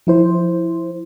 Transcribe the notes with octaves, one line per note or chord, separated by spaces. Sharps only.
F3 E4 C5